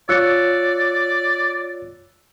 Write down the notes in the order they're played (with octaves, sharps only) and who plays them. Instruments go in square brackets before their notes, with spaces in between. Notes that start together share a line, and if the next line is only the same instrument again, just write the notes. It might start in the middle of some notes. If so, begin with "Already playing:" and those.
[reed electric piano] F4 C#5 A6 [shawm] D5 [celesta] E6 F#6 C#7